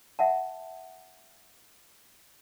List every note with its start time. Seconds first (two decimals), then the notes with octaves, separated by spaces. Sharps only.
0.19 E5 F#5 A5